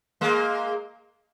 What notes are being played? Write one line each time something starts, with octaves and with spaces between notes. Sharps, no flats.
G#3 A#3